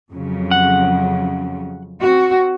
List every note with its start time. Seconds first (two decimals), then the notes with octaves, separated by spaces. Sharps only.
0.12 F2 C#3 F#3
0.51 F#5
2.02 C4 F#4